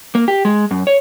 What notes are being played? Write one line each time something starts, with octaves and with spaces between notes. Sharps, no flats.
A#3
G4
G#3
F#2
C#5